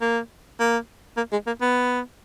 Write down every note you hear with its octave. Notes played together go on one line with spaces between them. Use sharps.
A#3
A#3
A#3
G#3
A#3
B3